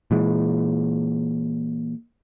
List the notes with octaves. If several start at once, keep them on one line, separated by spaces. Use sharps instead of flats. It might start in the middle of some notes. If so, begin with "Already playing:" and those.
A#2 E3 G#3